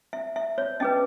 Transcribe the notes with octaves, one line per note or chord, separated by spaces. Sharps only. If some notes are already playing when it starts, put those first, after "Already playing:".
E5
E5
C#5
C#4 G#4 B4 D#5